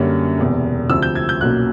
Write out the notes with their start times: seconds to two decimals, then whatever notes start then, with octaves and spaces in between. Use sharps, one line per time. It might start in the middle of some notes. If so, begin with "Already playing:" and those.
Already playing: F#2 D3 G3 A#3 C#4
0.38 E1 E2 C3
0.90 D2 C3 F3 E6
1.02 G6
1.15 G#6
1.29 G6
1.41 B1 A#2 F#3 A#3 C#4 F#6